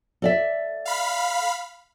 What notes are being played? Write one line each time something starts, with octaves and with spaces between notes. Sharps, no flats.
A4 D5 E5
F5 B5